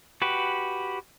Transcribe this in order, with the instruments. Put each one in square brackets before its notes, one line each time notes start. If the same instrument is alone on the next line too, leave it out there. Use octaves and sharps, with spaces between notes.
[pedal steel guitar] F#4 G4 B4